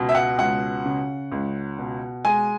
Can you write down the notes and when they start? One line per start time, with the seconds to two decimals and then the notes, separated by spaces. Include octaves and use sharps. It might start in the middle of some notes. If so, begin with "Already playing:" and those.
Already playing: C#2 B2
0.09 E5
0.15 F#5
0.38 C#2 F#5
0.86 C#3
1.32 C#2
1.79 B2
2.25 G#3 G#5